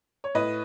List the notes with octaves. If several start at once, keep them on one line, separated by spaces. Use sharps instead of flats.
C#5
A2 B4 D#5